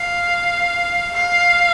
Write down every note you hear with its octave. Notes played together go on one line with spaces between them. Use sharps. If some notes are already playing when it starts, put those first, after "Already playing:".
Already playing: F5
F5